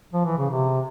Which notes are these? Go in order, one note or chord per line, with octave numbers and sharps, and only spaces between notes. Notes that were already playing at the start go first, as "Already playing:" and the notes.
F3
E3
C#3
C3